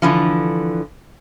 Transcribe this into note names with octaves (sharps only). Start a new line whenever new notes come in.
D3 E3 F3